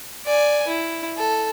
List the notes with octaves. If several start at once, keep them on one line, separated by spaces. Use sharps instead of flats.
D5 G#5
E4
A4